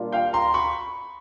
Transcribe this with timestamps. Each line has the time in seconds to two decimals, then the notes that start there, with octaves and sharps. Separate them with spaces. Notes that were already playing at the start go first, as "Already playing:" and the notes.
Already playing: A#2 G3 A#3 D4 F4
0.12 F5 G5
0.33 A#5 C6
0.54 B5 C#6